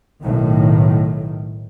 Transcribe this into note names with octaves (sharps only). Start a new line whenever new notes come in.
B1 A2 D#3